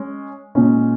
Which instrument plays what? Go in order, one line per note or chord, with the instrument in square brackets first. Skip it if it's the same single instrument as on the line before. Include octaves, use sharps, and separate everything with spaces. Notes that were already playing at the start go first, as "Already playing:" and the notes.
Already playing: [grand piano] G#3 C#4
A#2 G#3 C#4